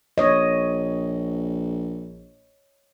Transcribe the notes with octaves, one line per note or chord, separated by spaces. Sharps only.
A#1 C#5 D#5